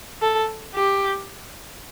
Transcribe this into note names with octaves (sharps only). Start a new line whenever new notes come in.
A4
G4